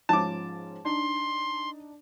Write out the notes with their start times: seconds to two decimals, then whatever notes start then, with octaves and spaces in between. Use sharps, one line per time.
0.09 G#2 F3 C#4 A5 D6
0.85 D4 D#4 C6